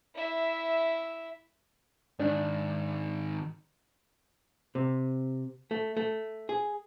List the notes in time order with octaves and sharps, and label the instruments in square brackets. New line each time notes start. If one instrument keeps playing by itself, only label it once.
[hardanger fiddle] E4 E5
[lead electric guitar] G#2 D#3 [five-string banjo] D4
[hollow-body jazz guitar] C3
A3
A3
G#4